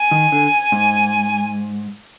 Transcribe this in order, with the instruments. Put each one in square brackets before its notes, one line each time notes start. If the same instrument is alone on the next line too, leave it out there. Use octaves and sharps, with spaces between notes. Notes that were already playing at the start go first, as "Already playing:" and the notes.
Already playing: [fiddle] G#5
[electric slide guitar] D#3
D3
G#2